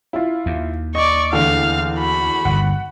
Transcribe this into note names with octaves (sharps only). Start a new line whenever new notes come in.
E4 F4
D#2
D5 D#5 C#6
E2 D3 A3 F5
F#4 B5
G1 D#2 F#5